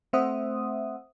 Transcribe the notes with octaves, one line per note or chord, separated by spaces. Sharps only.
A3 C4 C5 E5 F#5 D#6